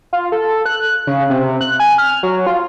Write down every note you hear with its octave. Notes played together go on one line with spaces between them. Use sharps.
F4
A4
F#6
C#3
C3
F#6
G#5
F6
F#3
F4